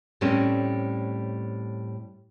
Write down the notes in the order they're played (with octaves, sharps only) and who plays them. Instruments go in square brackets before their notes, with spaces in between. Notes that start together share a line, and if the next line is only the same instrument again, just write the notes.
[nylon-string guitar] A2 G3 A3 C4 C#4